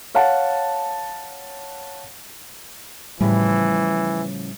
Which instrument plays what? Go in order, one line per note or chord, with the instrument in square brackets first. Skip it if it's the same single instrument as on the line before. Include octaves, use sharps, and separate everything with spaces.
[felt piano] C#5 F5 F#5 A5
[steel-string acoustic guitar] A2 C#3 F3 [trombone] E3 [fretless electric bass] G3